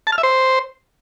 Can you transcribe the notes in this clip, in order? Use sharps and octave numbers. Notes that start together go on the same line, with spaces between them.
A5
F6
E5
C5